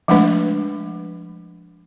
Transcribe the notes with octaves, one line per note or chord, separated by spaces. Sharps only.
F3 G#3 A3 D4 B4